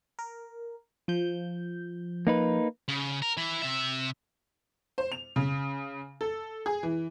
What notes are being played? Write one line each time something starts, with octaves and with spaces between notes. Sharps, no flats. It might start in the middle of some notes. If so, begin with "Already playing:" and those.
A#4
F3 G6
A#3 D#4 B4
C#3
A#4
E3 E4
C3 E5
C5
F7
C#3
A4
G#4
E3